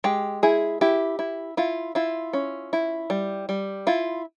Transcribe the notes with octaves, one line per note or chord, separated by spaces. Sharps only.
G#3 G4
E4 G#4
E4 G4
E4
E4 F4
E4 F4
C#4
E4
G3
G3
E4 F4